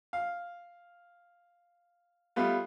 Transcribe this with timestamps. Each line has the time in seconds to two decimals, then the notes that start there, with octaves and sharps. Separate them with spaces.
0.13 F5
2.36 G3 A3 B3 F4